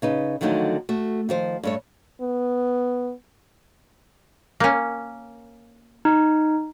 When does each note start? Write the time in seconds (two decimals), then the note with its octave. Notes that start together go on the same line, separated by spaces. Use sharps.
0.02 C#3 D#4 B4
0.41 D3 D#3 F3 F#3 A3 D#4
0.89 A3 F#4
1.29 D#3 F3 C5
1.63 G2 A3 C#5
2.21 B3
4.60 A#3 C#4
6.05 D#4